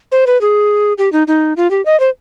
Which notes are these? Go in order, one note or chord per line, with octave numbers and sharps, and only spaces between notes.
C5
B4
G#4
G4
D#4
D#4
F4
G4
D#5
C5